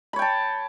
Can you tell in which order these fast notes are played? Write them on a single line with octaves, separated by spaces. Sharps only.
B5 C#5 G5 A5